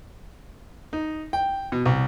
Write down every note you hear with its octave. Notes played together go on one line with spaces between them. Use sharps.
D#4
G5
B2
C2